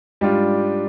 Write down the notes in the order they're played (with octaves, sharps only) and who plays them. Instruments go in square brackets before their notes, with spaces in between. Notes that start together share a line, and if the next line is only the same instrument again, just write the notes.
[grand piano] G#2 G3 D4 F4